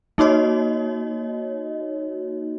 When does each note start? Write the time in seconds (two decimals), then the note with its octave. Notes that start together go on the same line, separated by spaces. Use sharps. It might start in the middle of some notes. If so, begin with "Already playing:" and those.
0.18 A#3 D#4 F#4 C#5 D#5